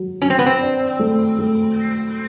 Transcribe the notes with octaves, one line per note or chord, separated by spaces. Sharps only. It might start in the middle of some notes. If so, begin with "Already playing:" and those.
Already playing: F#3
F#3 C#4
C4
B3
C4
D4
A3
A3